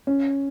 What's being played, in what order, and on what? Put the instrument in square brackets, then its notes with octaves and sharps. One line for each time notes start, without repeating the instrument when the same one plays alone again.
[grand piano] C#4